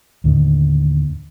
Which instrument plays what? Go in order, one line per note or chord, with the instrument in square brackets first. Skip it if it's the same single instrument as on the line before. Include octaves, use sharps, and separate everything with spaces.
[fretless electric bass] D#2 A2 D3 D#3